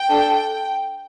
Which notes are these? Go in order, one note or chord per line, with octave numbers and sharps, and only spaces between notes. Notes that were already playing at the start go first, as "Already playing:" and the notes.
Already playing: G5
D4 A4